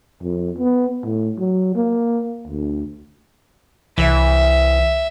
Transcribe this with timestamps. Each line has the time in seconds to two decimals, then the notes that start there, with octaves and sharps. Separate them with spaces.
0.22 F2
0.59 B3
1.04 A2
1.38 F#3
1.75 A#3
2.47 D2
3.98 C2 E3 E5